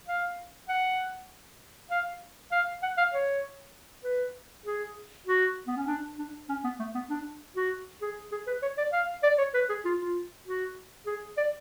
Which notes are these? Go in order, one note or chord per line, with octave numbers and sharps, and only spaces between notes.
F5
F#5
F5
F5
F#5
F5
C#5
B4
G#4
F#4
B3
C#4
D4
D4
C#4
B3
A3
B3
D4
F#4
G#4
G#4
B4
C#5
D5
F5
D5
C#5
B4
G#4
F4
F4
F#4
G#4
D5